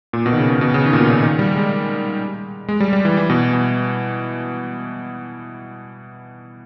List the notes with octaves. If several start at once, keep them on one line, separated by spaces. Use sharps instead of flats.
A#2
B2
D#3
C#3
B2
B2
C#3
D#3
A#2
B2
C#3
D#3
G3
G#3
G#3
G3
G3
E3
E3
B2
B2